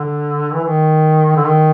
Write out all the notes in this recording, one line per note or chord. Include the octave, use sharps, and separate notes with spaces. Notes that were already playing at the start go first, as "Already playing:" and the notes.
Already playing: D3
E3
D#3
D3
D#3